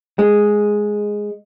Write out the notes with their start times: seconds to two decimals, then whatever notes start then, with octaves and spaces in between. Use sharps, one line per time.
0.19 G#3